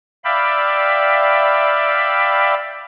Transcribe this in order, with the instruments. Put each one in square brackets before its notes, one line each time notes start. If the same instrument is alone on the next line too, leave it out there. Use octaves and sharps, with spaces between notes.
[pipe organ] D5 E5 F5 G5 B5